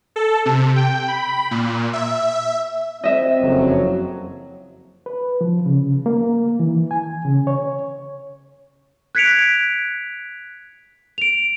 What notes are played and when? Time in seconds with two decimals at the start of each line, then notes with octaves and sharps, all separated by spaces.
0.16 A4
0.45 C3
0.76 G5
1.08 B5
1.51 A#2
1.93 E5
2.30 E5
3.04 C4 D#5 E5
3.41 F#1 F2 F#3
5.06 B4
5.41 F3
5.66 C#3
6.06 A#3
6.60 E3
6.91 G#5
7.25 C#3
7.47 C#5
9.15 F#6 G#6 B6 C#7 D7 F7
11.18 D7 F7